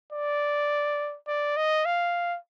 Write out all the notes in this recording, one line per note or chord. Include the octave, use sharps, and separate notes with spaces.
D5
D5
D#5
F5